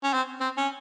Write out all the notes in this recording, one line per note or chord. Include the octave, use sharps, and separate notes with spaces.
C#4
C4
C4
C#4